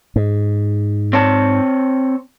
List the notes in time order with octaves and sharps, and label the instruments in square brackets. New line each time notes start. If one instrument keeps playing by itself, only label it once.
[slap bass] G#2
[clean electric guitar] C4 C#5 A5